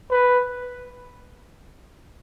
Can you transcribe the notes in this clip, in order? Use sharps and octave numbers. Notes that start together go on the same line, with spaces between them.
B4